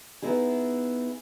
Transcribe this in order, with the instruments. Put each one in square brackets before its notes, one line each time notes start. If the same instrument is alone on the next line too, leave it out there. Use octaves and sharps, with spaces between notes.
[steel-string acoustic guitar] B3 D#4 E4 G#4